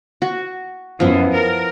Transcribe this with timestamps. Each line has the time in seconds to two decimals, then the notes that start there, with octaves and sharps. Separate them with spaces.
0.22 F#4
1.00 F#2 F3 B3 E4
1.34 A#4